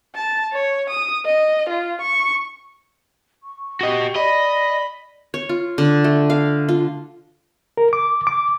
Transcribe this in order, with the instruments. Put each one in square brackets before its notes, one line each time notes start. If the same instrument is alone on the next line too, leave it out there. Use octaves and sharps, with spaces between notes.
[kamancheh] A5
C#5
D#6
D#5
F4
C#6
[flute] C#6
[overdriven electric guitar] F#4 D#5 [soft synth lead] G4
[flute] D5 [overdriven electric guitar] D#5 [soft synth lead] B5
[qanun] C#5
F4
D3
A3
F5
F4
[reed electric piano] A#4
D6
D6